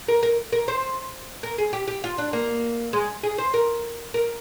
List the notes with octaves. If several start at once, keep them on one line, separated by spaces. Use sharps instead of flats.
A#4
A#4
A#4
C5
A#4
G#4
G4
G4
F4
D4
A#3
G#3
G#4
C5
A#4
A#4